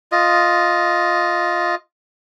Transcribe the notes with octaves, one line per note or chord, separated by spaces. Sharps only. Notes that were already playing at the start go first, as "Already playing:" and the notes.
F4 D#5